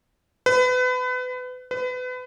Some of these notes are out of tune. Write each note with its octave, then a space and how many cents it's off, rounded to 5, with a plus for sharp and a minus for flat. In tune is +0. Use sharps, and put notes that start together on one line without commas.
B4 +30
B4 +30